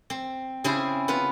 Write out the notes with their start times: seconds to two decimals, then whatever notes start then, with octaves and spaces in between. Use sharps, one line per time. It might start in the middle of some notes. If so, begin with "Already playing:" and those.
0.10 C4
0.64 C#3 C4 E4 G#4 C5
1.08 B3 F4 B4